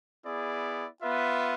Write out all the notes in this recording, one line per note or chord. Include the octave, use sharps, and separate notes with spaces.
B3 E4 G#4 D5
B3 F4 B4 E5